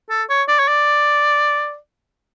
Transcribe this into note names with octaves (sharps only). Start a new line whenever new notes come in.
A4
C#5
D5
C#5
D5